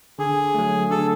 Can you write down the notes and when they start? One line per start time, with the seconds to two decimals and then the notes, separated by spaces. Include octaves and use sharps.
0.19 D3 G#4
0.54 F#3 A3
0.90 D3 A4